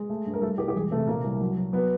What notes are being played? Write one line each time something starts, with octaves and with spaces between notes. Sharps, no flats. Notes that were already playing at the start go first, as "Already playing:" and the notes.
Already playing: G#3
A3
G2
A#4
G3 A3 A4
C2 G4
G4
E1 G#4
C3 A3 A4
A#2 A#3 A#4
C2
F#3
F#3
F#3 B3 B4